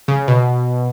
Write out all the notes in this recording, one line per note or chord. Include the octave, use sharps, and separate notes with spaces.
C#3
B2